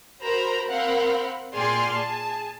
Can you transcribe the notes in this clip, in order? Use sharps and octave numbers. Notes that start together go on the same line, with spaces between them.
F#4 A#4 C5 A#5 B5
C4 A#4 F5 F#5 B5
A#2 G#4 D5 G5 C6 F6
G#4 A5